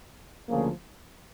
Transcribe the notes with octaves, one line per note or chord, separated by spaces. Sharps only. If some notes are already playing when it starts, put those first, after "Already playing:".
D2 C#3 F3 A#3